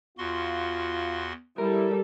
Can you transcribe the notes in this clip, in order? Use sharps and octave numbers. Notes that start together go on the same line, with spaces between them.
E2 F4 F#4 C6
G3 E4 A4 A#4